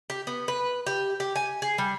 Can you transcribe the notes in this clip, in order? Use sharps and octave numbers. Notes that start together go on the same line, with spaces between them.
G4
B3
B4
G4
G4
G#5
G#4
G3